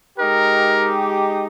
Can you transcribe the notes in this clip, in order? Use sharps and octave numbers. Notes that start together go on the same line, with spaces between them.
G#3 D#4 G4 A#4